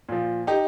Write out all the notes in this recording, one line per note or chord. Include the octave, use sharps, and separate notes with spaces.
A#2 F3
D#4 G4